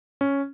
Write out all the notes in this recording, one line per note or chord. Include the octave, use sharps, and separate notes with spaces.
C#4